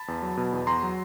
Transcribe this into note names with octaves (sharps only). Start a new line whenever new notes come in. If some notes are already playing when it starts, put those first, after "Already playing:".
Already playing: A5 B5
E2
F#3
B2
E2
E2 A#5 C6
F#3